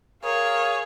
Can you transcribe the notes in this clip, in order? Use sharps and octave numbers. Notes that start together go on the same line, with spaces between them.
G#4 A#4 C#5 F5